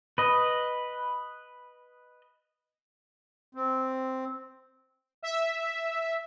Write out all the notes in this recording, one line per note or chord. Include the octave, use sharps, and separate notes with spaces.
B4 D#5
C4
E5